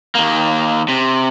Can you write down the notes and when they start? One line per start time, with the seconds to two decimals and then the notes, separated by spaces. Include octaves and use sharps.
0.15 D#2 A#3
0.88 C3